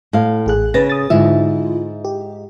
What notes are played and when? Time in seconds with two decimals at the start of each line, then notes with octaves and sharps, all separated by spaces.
0.13 A2 F5
0.46 A1 G#4 F#6
0.74 C#3 B4 A6 A#6
0.90 D#6 A6
1.10 G#2 D3 E4 F4 E5
2.05 G4